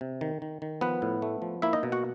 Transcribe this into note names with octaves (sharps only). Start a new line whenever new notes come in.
C3
D#3
D#3
D#3
F3 B3 B4
A2
A3
F3
A#3 E4 E5
D#4 D#5
B2
F#4 F#5